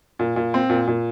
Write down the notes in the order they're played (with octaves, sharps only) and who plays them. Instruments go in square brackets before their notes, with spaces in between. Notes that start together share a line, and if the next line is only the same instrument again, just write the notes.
[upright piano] A#2
A#2
C4
A#2
A#2